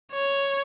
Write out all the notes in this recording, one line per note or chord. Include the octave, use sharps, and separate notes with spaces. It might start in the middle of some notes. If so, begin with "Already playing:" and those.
C#5